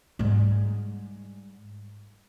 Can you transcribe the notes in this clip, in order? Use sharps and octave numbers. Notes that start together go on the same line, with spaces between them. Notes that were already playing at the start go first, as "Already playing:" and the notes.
G#2 G3